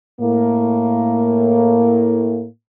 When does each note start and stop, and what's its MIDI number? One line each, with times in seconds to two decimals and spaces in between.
0.20 2.46 45
0.20 2.46 58